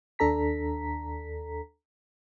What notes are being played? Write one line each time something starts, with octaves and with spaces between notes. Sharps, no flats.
D#2 D4 A4 A#5 B6